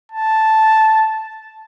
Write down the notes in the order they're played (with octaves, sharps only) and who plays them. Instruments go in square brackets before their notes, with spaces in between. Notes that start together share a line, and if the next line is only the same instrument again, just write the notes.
[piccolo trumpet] A5